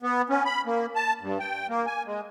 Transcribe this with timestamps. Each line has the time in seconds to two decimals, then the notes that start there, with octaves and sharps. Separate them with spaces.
0.03 B3
0.30 C#4
0.45 B5
0.66 A#3
0.95 A5
1.21 G2
1.39 G5
1.69 A#3
1.86 G#5
2.06 G#3